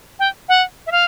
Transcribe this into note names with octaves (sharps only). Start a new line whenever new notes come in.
G5
F#5
E5
F5